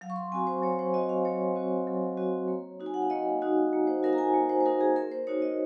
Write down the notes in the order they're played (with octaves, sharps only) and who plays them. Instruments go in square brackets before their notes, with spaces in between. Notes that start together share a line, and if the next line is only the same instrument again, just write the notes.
[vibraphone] F#3 F5
C#6
C6
C4 F#4 G#5
C5
F#3 C#5
C5
C4 F#4 D#5
F5
F#3 C#5
C4 F#4
F#3
C4 F#4
A#3
D#4 F#4
G#5
F#5
F5
A#3 D#5
D#4 F#4
A#3
C5
D#4 F#4 A#4
A#5
G#5
A#3
C5
C5
D#4 F#4 A#4
G#4
A#3 A#4
C5
D#4 F#4 C#5
D#5